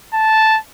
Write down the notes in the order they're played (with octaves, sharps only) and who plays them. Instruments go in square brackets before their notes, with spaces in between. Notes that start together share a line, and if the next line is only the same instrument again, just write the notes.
[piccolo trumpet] A5